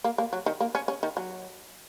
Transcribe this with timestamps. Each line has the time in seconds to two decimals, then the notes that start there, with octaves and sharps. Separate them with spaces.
0.04 A#3
0.18 A#3
0.33 F#3
0.46 D#3
0.61 A#3
0.75 C#4
0.88 C#4
1.03 D#3
1.17 F#3